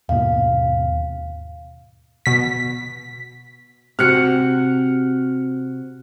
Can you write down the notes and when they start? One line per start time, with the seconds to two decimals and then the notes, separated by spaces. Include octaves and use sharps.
0.09 D#2 G#2 B2 F5
2.26 B2 B6
3.99 C3 F#4 F6 F#6 C#7